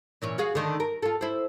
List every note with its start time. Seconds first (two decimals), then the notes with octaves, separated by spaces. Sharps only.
0.22 A#2 E3 C#4
0.38 F#4 G#4 F5
0.55 D3 D#3 A3
0.80 A#4
1.02 F4 A4
1.21 E4 C5